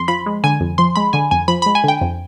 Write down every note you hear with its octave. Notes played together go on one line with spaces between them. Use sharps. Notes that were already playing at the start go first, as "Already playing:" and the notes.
Already playing: F2 C6
F3 B5
G#3
D3 G#5
F2
F3 C6
G#3 B5
D3 G#5
F2 G#5
F3 B5
G#3 B5
G#5
D3 G5
F2